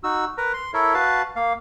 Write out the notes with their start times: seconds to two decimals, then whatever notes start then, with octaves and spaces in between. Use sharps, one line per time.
0.04 D#4 F#4 E6
0.38 A#4 B4 A#5
0.53 C6
0.74 E4 A4 A#4 C#5 E5
0.94 F#4 B4 F5 A5
1.36 A#3 F5